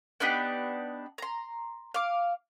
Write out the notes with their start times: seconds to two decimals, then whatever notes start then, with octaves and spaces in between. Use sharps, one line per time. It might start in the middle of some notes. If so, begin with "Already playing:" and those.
0.20 B3 D4 D#4 G4
1.18 A#5 C6
1.94 F5 D6